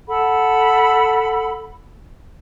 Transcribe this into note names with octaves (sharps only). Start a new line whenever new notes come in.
A4 F#5 B5